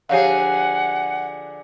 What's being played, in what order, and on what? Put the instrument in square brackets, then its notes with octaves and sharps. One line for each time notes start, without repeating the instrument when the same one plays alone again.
[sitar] D3 F3 G#4 [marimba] G4 C#5 F5 [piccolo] F#5